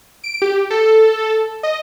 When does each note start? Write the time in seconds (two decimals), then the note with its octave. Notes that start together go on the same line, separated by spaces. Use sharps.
0.24 D7
0.42 G4
0.70 A4
1.63 D#5